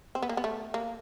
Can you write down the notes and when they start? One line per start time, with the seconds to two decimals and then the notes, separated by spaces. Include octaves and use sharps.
0.15 C4
0.22 B3
0.29 A#3
0.37 B3
0.44 A3
0.74 A#3